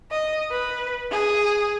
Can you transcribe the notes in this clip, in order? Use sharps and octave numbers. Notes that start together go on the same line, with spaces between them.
D#5
B4
G#4